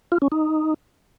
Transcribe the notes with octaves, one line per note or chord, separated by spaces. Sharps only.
F4
C#4
D#4